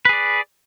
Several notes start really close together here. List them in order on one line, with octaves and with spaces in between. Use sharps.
B4 G#4 D5